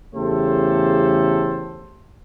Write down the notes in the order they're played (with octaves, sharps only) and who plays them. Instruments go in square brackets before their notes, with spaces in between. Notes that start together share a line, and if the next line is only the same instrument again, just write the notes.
[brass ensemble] E2 C#3 A3 G4 A4 C5